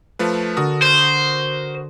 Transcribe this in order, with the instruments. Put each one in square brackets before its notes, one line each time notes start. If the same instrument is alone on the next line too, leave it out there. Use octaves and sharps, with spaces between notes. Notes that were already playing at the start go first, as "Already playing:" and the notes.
[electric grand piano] F3 A3 B4
[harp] D3 A4 [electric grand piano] F#4 A#4 D#6
[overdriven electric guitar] C5 [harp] C6